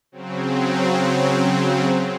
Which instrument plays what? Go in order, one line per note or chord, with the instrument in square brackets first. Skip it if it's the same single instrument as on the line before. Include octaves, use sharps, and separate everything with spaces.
[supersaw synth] C#3 F#3 C4